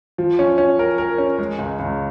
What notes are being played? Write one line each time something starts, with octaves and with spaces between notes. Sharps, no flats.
F3
C#4
C#4
A#4
A#4
C#4
G#3
C#2
C#2